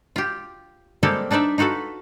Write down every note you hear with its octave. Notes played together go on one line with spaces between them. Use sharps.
F4 G4
G3 G#3 A#3 C4 G4 A4
D4 D#4 B4 D5 E5
D#4 F4 F#4 A4 B4